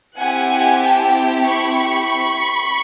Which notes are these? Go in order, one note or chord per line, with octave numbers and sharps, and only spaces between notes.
C4 E4 G4 F#5 G#5
G5 A5
B5 C#6